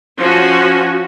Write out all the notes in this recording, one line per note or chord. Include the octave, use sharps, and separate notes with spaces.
F3 C#4 F#4